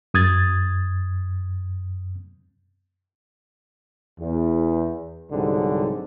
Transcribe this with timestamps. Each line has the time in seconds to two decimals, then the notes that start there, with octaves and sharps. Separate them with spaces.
0.14 F#2 D#6 G#6 A6
4.20 E2
5.31 C2 G#2 D3 F#3 G3